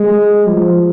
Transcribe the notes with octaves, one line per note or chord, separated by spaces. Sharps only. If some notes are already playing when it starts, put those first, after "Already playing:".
Already playing: G#3
F3